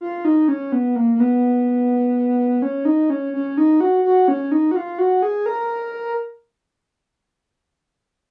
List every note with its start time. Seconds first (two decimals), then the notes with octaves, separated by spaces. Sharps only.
0.01 F4
0.25 D#4
0.48 C#4
0.72 B3
0.96 A#3
1.15 A#3
1.20 B3
2.62 C#4
2.85 D#4
3.10 C#4
3.33 C#4
3.57 D#4
3.81 F#4
4.04 F#4
4.28 C#4
4.52 D#4
4.71 F#4
4.76 F4
4.98 F#4
5.22 G#4
5.46 A#4